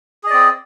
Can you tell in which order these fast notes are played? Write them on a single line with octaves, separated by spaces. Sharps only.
G#4 D#5 D5 C4